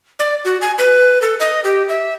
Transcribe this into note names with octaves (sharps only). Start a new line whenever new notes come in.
D5
F#4
G#5
B4
A4
D#5
G4
E5